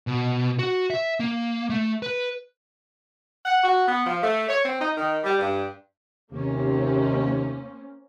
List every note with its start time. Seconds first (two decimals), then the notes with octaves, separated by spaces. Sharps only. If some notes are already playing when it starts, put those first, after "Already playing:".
0.07 B2
0.59 F#4
0.90 E5
1.20 A#3
1.70 A3
2.03 B4
3.45 F#5
3.64 F#4
3.88 B3
4.07 F3
4.23 A3
4.49 C#5
4.65 C4
4.81 D#4
4.97 D#3
5.24 G3
5.39 G2
6.32 D#2 C3 A#3 C4 C#4